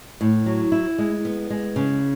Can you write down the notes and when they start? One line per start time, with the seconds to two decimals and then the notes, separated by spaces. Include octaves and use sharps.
0.21 A2
0.46 F#3
0.72 E4
0.98 G#3
1.25 B3
1.50 G#3
1.76 C#3